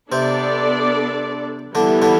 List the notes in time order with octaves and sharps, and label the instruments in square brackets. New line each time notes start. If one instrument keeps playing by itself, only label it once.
[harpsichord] C3 C4 [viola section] B3 D4 A4 D5
[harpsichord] D3 D4 [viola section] E3 G3 B3 E4
[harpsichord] D3 D4